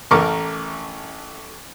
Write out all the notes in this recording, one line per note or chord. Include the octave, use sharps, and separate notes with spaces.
A1 A3 A#4 C#6 D6